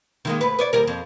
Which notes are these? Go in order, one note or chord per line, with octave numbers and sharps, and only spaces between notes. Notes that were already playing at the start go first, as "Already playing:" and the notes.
D#3 G#3 A#3
D2 B4
B4 C#5 D5
D#2 G3 A#4
F2